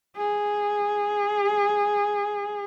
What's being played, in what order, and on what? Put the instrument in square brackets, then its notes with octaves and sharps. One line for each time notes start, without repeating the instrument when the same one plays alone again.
[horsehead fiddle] G#4